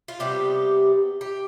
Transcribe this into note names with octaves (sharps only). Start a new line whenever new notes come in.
F4
C3 G3 B3 G4
G4